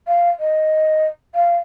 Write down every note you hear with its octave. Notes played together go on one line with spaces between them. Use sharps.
F5
D#5
F5